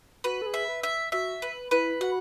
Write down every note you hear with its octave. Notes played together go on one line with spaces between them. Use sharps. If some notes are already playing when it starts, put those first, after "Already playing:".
F#4 B4
A4
G#4
E5
B4
E5
F#4 E5
B4
E4 B4
F#4 F#5